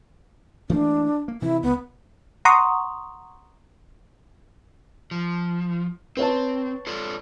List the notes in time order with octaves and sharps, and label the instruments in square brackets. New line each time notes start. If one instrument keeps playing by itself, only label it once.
[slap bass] E3 A3 A#3 [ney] D4
[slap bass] A#3
[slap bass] C3 E3 [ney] E4
[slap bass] C#2 [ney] B3
[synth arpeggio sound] F#5 A#5 C6 C#6 D#6
[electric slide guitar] F3
[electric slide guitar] C4 [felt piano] B4 C#5 A5
[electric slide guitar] F4 A4 D5